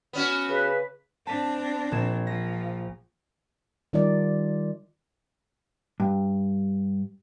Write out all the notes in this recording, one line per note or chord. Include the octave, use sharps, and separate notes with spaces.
B3 C#4 F#4
C#3 B4
C4 D4 A5 B6
A#1 G#6 E7
F3 A#6
D#3 G3 D#4 F4 A#4 D5
G2